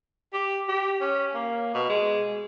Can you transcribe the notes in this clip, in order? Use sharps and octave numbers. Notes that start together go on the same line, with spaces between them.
G4
G4
C#4
A#3
B2
G#3